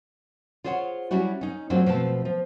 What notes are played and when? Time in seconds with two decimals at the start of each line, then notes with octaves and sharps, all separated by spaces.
0.64 F4 G#4 C5 C#5 F#5
1.11 F#3 G3 C#4 E4 F#4
1.41 C#4 D#4
1.70 F#3 G#3 A3 C4 D4 F4
1.86 B2 F3 A3 C4 A5
2.25 F3